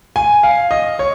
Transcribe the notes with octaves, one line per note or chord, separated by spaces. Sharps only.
G#5
F5
D#5
C#5